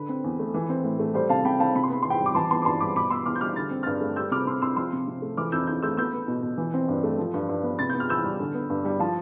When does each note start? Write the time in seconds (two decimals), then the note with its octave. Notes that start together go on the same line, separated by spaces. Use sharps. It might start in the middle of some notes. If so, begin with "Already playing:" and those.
Already playing: D3 B4
0.09 C4
0.24 E2
0.39 A3
0.54 E3
0.69 C4
0.84 A2
0.99 A3
1.14 G3 C5
1.29 C3 F5 A5
1.45 C3 G5 B5
1.60 C4 F5 A5
1.75 C3 B5
1.84 C6
1.90 B3 B5
2.03 E2 C6
2.10 G5 B5
2.20 G3
2.26 D6
2.35 E3 A5 C6
2.51 B3 A5 C6
2.62 D6
2.65 G2 A5 C6
2.80 G3 B5 D6
2.96 B2 B5 D6
3.10 B3 C6 E6
3.25 E2 D6 F6
3.35 G6
3.41 G3 D6 F6
3.56 D3 A6
3.71 C4
3.83 G2 F6 A6
4.01 A3
4.16 G3 E6 G6
4.31 C3 D6 F6
4.46 C3 C6 E6
4.61 C4 C6 E6
4.76 F3 C6 E6
4.93 C3
5.08 C3
5.22 A3
5.37 E3 D6 F6
5.52 F2 E6 G6
5.67 F2 E6 G6
5.83 A3 E6 G6
5.97 B3 E6 G6
6.13 B3
6.28 B2
6.43 B2
6.58 E3
6.74 C4
6.88 G2
7.03 A3
7.18 F3
7.34 G2
7.49 G2
7.63 B3
7.79 C3 A6
7.90 B3 G6
8.00 F6
8.09 E2 E6 G6
8.24 G3
8.40 D3
8.54 B3
8.70 G2
8.85 G3
8.99 F3 F5 A5